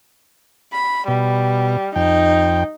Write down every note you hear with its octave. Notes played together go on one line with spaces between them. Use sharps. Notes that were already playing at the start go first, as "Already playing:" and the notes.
B5
B2 G3
F2 D#4 G5